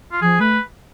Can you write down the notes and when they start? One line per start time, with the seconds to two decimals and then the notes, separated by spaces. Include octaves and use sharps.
0.12 F4
0.21 F3 G#4
0.40 A3 B4